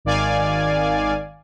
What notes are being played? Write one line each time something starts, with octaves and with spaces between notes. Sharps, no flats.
G#1 D#3 D5 F5 G#5